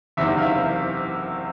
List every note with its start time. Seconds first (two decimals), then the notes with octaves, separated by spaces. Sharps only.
0.17 F#1 E2 C3 D#3 E5
0.38 F5
0.42 E5